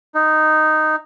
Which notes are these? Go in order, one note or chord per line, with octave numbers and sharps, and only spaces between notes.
D#4